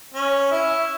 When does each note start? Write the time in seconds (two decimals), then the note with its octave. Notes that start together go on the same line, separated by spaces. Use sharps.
0.14 C#4
0.51 E4